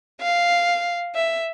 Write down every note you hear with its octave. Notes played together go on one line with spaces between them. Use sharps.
F5
E5